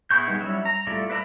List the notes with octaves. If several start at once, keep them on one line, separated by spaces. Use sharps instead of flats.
B3 E4 G#4 C#6 G6
G3 G#3 B3 D#4
F#3 G3 C#4 E4 E5
A#5
G3 A3 E4 F4 D5
B4 D5 E5 A#5 B5